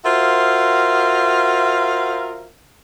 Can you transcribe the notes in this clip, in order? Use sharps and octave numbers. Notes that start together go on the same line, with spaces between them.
F4 F#4 A#4 C5 E5 F5